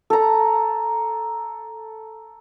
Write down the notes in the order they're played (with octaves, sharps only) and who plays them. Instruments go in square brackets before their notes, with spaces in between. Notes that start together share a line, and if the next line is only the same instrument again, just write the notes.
[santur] A4 A#5